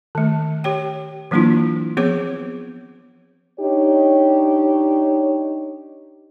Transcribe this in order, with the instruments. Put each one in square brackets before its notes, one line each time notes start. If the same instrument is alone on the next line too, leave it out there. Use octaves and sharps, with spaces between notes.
[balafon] D#3 A3
G4 C#5 G5
E3 F#3 A#3 D4 E4 F4
F3 B3 C4 G#4 C#5 D6
[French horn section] D4 D#4 G4 C#5